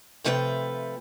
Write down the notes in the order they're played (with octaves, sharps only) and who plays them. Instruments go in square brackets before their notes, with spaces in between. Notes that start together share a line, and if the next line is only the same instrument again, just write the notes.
[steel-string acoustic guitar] C3 F3 A3 B4 C#5 G5